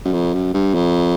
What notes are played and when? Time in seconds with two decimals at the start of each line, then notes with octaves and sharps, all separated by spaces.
0.05 F#2
0.13 F2
0.34 F#2
0.54 G2
0.74 F2